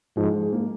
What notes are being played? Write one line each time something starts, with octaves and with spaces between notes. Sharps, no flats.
G#2 F3
G#3
F3
G#3
A#3